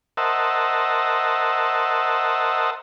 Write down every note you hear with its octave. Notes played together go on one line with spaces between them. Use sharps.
A#4 C5 D#5 E5 F#5 A5